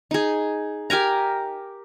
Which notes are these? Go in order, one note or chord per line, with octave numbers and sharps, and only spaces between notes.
D#4 G#4
G4 A#4 G#5 A#5